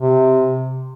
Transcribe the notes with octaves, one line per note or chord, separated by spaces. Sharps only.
C3